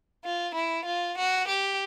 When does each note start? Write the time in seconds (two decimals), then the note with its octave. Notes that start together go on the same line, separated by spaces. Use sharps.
0.23 F4
0.54 E4
0.85 F4
1.17 F#4
1.48 G4